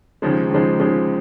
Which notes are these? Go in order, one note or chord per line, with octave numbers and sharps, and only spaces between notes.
D#2 C#3 F3 G#3
D#2 C#3 F3 G#3
D#2 C#3 F3 G#3